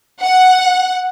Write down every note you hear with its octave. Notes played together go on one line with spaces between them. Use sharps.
F#5